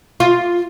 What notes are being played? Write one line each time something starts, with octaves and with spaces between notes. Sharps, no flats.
F4